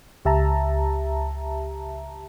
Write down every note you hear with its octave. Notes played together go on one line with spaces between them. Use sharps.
C#2 G4 E5 A5 A#5